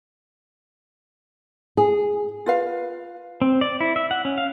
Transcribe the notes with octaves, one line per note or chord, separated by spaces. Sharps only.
G#4
F4 B4 F5
C4
D5
E4
E5
F#5
C#4
F5